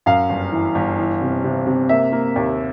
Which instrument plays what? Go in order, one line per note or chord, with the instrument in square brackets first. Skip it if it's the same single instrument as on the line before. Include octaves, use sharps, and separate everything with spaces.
[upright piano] F#2 F5
G1
E3
G1
E3
C3
C3
C3
A#3 E5
A#3
D#2